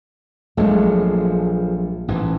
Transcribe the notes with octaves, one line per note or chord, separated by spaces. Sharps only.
A#1 F3 F#3 G#3 A3
A1 G#2 E3